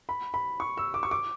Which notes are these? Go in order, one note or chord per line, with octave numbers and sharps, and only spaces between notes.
B5
B5
C#6
E6
D6
C#6
D6